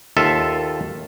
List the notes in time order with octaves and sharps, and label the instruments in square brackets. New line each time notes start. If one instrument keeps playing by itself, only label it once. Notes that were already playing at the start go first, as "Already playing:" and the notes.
[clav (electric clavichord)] D#2 F4 A4 E5